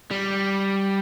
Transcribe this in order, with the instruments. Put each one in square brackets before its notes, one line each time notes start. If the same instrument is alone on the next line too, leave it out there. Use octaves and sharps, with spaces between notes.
[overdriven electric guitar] G3